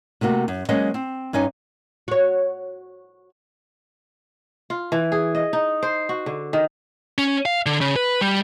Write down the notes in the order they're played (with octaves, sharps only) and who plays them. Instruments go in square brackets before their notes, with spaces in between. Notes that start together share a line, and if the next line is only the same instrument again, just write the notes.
[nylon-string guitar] C3 A3 A#3 F#4
F#2
F#3 G#3 A#3 C#4 C5 D#5
C4
G2 C#4 D#4 G#5
[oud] F#4 C#5
[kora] F4
E3
G#4
D#5
D#4
C5
F#4
D3
D#3
[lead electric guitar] C#4
F5
D3
C#3
B4
G3